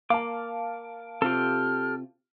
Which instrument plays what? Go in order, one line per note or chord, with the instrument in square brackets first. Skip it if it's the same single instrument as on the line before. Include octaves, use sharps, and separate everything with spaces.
[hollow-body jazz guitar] A#3 [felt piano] F5 A5 [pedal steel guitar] D6
[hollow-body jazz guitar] C3 F4 [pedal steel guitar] G4 A4 [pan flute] F6